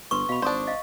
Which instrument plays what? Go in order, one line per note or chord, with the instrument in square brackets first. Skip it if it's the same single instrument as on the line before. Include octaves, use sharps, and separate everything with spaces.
[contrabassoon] G1 [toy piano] A4 B4 C6 [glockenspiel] C#6
[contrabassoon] B2 [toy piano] F5 B5
[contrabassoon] G#1 [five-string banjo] D4 C5 [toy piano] D5 D#6
[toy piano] D#5 F5